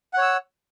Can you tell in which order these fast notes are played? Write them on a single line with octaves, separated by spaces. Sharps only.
F#5 C#5 E6